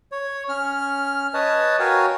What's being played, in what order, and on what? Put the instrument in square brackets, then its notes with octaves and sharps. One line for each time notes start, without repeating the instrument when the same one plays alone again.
[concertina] C#5
C#4 F6
B4 C#5 D#5 A5
F#4 A#4 C#5 F5 G5 G#5